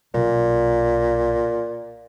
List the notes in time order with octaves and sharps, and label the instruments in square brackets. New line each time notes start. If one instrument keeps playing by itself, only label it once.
[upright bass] B1 [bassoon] A#2